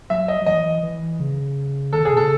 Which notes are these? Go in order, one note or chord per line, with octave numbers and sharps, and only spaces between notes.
F#3 E5
D#5
F#3
E3 D#5
E3
C#3
D#3 A4
C#3 G#4
B2 A4
C#3